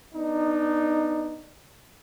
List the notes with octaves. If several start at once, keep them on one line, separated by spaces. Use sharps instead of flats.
B3 D4 D#4